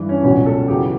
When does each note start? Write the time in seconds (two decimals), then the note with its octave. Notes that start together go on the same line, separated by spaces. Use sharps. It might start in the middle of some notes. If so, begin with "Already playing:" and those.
Already playing: G2 E3
0.09 C#4
0.23 C#2 B2 F#3 C#4
0.46 A4
0.68 E2 C#3 F#3 G4